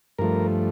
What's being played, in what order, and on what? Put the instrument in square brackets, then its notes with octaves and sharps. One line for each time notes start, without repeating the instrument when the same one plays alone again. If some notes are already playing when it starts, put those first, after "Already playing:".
[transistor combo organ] G2 F3 A3 A#4